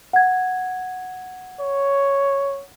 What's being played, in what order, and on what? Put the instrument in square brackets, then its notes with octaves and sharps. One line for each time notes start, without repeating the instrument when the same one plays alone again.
[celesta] F#5 G#6
[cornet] C#5